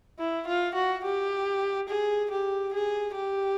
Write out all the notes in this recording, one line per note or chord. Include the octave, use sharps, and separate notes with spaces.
E4
F4
F#4
G4
G#4
G4
G#4
G4